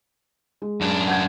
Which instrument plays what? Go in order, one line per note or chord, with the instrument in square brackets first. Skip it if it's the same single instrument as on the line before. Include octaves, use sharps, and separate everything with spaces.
[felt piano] G#3
[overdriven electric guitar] F#2 D4
[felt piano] F#5 G6 G#6